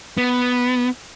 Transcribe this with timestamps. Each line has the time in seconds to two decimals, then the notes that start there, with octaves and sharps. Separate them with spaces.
0.18 B3